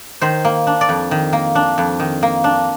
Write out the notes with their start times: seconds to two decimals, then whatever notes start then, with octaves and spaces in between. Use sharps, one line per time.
0.21 D#3 C5
0.45 A#3
0.67 D4
0.81 D5
0.89 F2
1.11 D#3
1.33 A#3
1.55 D4
1.78 F2
2.00 D#3
2.23 A#3
2.44 D4